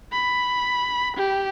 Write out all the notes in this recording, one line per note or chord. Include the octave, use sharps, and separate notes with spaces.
B5
G4